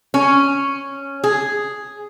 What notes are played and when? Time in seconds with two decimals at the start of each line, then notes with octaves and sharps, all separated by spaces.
0.14 C#4
1.24 G#4